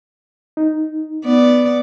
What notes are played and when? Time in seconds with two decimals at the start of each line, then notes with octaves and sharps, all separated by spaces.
0.57 D#4
1.25 B3 D5